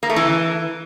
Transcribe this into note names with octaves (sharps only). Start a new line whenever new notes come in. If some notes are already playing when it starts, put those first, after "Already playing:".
A#3
A3
E3